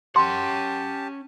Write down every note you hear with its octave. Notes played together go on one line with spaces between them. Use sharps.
C#4 G4 F#5 A5 C6